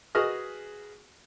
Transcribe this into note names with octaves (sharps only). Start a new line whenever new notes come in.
F#4 G#4 B4 D#5 F6